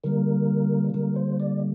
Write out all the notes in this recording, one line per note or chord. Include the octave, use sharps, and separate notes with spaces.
D3 G3 A#3 A#4
D3 G3 A#3 A#4
C5
D5